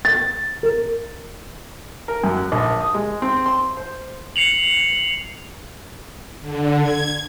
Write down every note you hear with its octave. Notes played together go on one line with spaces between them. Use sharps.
A6
A#4
A#4
F#2
F#6
A#1
D#6
G#3
C4
C6
C5
C7 C#7 F7 F#7
D3
G#6